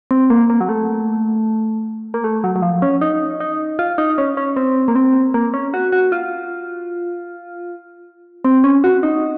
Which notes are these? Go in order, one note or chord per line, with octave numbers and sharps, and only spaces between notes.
C4
A#3
A#3
F#3
A3
A#3
A3
F#3
F#3
F3
C#4
D#4
D#4
F4
D#4
C#4
C#4
C4
A#3
C4
A#3
C#4
F#4
F#4
F4
C4
C#4
F#4
D#4